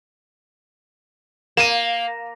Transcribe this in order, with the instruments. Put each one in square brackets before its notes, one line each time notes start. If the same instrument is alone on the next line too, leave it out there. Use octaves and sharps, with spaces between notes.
[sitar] A#3 [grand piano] D#7 E7